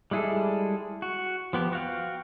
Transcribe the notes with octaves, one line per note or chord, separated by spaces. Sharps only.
G3 G#3 E4 G#4 A4
F#4
F3 B3 G4
F#4 F5 G5